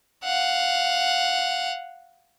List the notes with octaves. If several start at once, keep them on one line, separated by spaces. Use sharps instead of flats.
F5 F#5